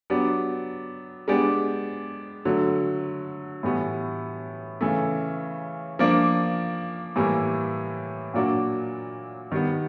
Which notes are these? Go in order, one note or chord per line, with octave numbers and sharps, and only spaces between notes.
F#3 B3 D4 G4
G#3 B3 D4 G4
D3 F#3 A3
A2 E3 G3 B3
C#3 E3 A3
F3 A#3 D4
A2 E3 G3 A#3
A#2 F#3 A#3 D4 F#4
D#3 G3 B3